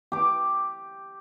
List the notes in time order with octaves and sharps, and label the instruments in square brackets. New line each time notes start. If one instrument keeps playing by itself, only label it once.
[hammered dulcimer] G4 D6